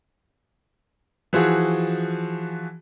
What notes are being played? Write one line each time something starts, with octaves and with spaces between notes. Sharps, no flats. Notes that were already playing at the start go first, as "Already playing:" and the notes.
E3 F3 F#4 G#4